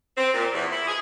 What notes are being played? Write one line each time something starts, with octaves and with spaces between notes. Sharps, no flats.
C4
A#2
E2
E4
G#4